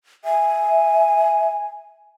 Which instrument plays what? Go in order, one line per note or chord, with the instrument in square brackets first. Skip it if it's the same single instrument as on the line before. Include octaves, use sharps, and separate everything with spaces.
[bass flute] E5 [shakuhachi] G#5